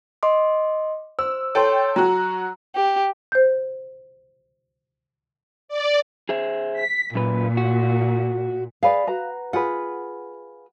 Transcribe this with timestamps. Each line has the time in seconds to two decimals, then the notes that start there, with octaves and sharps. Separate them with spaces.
0.23 D#5 C6 D6
1.19 C5 E6
1.55 A4 C#5 G5 C6
1.96 F#3 F#4 A#5
2.76 G4
3.32 C5 G6
5.68 D5
6.29 G#4 C5 E5
6.76 B6
7.15 F#2 A#2 B4
7.57 F#4
8.83 G#4 B4 D5 F5
9.07 F#4 B4 A#5
9.53 F4 G#4 B4 F#5